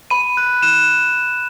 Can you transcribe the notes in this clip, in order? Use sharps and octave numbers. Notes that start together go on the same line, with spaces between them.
B5 D#7
F#6
F#6 E7